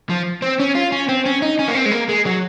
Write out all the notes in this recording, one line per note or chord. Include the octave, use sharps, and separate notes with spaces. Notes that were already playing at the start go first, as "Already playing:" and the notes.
F3
C4
C#4
F4
C#4
C4
C#4
D#4
C#4
A#3
C4
G#3
A#3
G#3
F#3